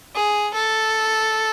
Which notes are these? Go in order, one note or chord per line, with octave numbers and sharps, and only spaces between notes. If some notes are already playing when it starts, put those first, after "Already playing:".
G#4
A4